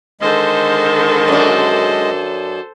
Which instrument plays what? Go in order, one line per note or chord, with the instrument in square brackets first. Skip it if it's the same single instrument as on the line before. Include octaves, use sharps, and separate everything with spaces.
[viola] D3 D#3 [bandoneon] G#3 D#5 [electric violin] A4 C5
[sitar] F#2 D4